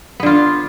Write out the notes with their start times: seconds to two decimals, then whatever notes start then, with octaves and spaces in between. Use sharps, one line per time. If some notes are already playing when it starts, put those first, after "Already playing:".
0.20 B3
0.23 D3
0.26 F4